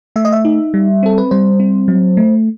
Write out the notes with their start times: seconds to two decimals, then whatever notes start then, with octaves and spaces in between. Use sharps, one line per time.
0.16 A3 E5
0.25 D#5
0.32 E5
0.45 D#4
0.74 G3
1.03 C4 A4
1.18 B4
1.31 G3 C5
1.60 C4
1.88 F#3
2.17 A3